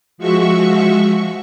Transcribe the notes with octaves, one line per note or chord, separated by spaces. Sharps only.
F3 G#3 F#4 E5 C#6